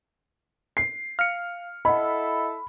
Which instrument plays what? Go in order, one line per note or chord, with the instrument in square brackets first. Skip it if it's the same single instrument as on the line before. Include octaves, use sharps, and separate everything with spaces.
[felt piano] C7
[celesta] F5 [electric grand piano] F6 C#7
[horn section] E4 A4 [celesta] D#5 F#5 [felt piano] B5